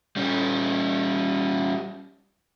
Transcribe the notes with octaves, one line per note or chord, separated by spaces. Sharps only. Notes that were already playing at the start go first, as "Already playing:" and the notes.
G3 C#4